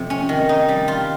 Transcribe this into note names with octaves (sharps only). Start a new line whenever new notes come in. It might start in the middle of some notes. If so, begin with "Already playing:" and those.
Already playing: F2 C3
C#4
D#3
D#4
G3
F4